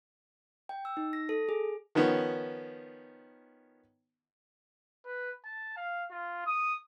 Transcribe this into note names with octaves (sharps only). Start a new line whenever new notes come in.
G5
E6
D#4
A#6
A4
G#4
D#3 F3 B3 C#4
B4
A5
F5
F4
D#6